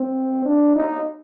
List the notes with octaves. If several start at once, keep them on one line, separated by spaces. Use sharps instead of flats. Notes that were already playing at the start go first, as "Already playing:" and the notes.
Already playing: C4
D4
D#4